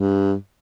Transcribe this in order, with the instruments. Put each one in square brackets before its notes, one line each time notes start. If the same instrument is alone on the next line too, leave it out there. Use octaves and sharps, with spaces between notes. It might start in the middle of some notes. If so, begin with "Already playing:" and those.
Already playing: [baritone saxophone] G2